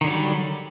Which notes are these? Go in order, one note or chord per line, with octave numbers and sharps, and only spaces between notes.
D3 D#3 F#3 G3